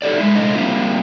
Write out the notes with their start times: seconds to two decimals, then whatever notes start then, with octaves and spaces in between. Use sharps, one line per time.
0.02 D#4 G4 A4 D5
0.18 G#3 E4
0.35 C3 G#3 A3 D4 D#5
0.55 G3 A#3 C4 E4 F4